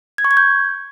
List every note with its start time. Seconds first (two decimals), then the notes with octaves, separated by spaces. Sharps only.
0.18 G#6
0.25 C#6
0.31 G#6
0.37 G6